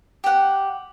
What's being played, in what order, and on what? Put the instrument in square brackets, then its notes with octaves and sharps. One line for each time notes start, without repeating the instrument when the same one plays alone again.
[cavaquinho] G4 F#5